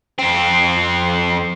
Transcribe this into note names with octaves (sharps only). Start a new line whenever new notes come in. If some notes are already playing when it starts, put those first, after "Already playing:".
F2 C4